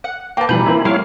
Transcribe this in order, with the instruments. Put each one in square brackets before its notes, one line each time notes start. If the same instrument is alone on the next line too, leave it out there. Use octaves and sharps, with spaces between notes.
[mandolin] F#5
[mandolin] A#3 A5 [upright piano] B4 G5
[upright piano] F1 E3 G3 [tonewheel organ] B2 [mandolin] B4 [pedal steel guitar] A#5 B5 G6
[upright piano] E3 A#3 C4 [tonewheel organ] E4
[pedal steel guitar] G3 A3 [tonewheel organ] E4 C#5 F5 [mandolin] A#4